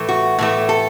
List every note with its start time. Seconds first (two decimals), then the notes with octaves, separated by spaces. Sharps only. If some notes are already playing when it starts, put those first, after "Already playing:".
Already playing: A2 E3 A3
0.09 F#4
0.39 A2 E3 A3
0.69 A4